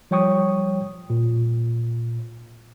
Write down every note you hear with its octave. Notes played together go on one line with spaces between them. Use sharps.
F3 G3 C#5 G5 C#6 D#6
A#2